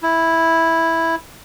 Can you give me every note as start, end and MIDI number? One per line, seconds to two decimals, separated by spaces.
0.03 1.15 64